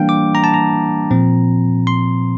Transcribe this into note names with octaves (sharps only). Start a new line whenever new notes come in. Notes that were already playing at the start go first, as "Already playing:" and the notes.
Already playing: E3 G3 A#3 D4 F5 G5
D6
A#5
A5
A#5
A#2 F3 C4
C6